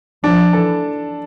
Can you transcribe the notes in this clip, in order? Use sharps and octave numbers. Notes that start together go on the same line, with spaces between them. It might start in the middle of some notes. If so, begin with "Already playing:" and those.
F3 D4
E3 A4